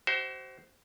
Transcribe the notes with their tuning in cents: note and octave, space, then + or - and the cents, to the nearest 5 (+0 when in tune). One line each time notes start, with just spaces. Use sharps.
F#4 +35 C5 +0 E5 +0